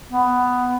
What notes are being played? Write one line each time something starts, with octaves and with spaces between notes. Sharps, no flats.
B3